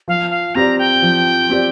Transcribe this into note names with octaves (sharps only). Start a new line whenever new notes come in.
F3 F5
F5
C4 G4 D5 A#5
G5
F3
C4 G4 D5